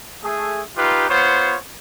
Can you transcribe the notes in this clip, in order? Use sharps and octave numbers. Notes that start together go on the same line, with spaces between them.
A3 G#4
D#4 F4 G4 B4
B3 F4 C5 C#5